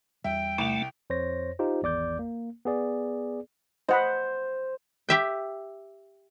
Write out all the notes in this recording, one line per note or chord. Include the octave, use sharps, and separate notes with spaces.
E2 G3 E5 G5
C2 A3 F7
F2 C5 C#5 A#6
D#4 F4 G4 C5
G#1 E2 D5 D6 G6
A#3
B3 G#4 D5
C5 D#5 F#5 B5
G4 E5 G5